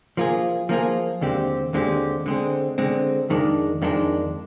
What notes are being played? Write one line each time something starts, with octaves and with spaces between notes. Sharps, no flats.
F3 A#3 F4 G#4
F3 A#3 F4 G#4
D#2 D3 G#3 C4 G4
D#2 D3 G#3 C4 G4
D3 G#3 C4
D3 G#3 C4
F2 D#3 G#3 D4
F2 D#3 G#3 D4